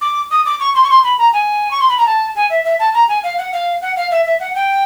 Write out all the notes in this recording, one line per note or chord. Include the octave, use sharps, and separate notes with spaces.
D6
D#6
D6
C#6
C6
C#6
C6
B5
A#5
G#5
C#6
C6
B5
A#5
A5
G#5
E5
E5
A5
A#5
G#5
F5
F#5
F5
F#5
F5
E5
E5
F#5
G5